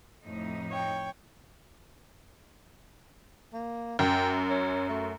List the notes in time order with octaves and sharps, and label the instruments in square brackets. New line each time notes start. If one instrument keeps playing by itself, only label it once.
[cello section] F2 A2 D#4
[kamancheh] C#5 G5
[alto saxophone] A#3
[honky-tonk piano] F#2 [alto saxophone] G5
[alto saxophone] C#4
A3